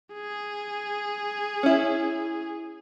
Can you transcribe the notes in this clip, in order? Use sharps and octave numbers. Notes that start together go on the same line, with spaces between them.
G#4
C#4 E4